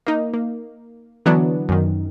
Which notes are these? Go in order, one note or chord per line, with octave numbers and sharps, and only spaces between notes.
A#3 D#4
A#3
D3 E3 F#3 B3 D4
F#2 D#3